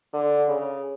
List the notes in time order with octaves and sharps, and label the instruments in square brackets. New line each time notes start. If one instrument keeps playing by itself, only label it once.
[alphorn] D3
C#3